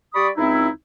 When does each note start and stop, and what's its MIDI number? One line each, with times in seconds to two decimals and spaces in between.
0.14 0.29 55
0.14 0.29 67
0.14 0.29 74
0.14 0.29 83
0.14 0.29 85
0.14 0.29 87
0.37 0.68 37
0.37 0.68 60
0.37 0.68 63
0.37 0.68 64